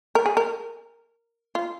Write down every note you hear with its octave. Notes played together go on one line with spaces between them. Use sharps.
A#4
G#4
A#4
F4